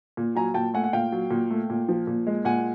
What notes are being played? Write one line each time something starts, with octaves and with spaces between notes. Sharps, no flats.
A#2
F#3 G#5 A#5
A#2 G5 A5
A3 F#5 G#5
F#5
A#2 F5 G5
F#3
A#2
A3
A#2
F3
A#2
G#3
A#2 F#5 G#5